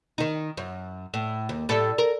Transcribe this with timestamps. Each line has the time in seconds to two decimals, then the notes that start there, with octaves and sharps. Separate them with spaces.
0.18 D#3 D#4
0.57 F#2
1.14 A2
1.49 D#2
1.69 A2 G3 A4
1.98 A#4